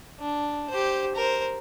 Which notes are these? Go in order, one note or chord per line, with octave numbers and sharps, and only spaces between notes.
D4
G4 C5
A#4 C5